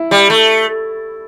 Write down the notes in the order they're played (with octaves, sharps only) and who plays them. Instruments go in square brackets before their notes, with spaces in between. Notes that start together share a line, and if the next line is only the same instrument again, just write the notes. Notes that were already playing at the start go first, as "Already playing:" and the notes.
Already playing: [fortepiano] E4
[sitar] G3
A3